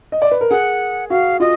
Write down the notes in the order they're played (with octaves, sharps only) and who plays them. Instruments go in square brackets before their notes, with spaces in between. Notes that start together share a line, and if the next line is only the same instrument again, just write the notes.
[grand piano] D#5
D5
B4
A#4
[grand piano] G#4 [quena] F#5
[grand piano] F#4 [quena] F5
[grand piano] F4 [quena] D#5